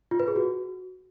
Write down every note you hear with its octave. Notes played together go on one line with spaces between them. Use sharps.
F4
B4
G#4
F#4